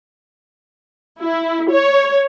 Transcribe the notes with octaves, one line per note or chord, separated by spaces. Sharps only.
E4
C#5